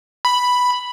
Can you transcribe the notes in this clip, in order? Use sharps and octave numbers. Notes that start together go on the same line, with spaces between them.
B5